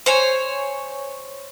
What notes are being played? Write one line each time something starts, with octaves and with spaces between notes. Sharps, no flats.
C5 C#5 G#5